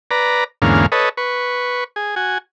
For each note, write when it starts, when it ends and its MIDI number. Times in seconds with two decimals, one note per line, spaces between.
0.11 0.44 71
0.11 0.44 74
0.11 0.44 82
0.62 0.86 40
0.62 0.86 44
0.62 0.86 50
0.62 0.86 58
0.62 0.86 61
0.62 0.86 77
0.92 1.09 69
0.92 1.09 71
0.92 1.09 73
0.92 1.09 75
1.17 1.84 71
1.17 1.84 85
1.96 2.15 68
2.16 2.38 66
2.16 2.38 80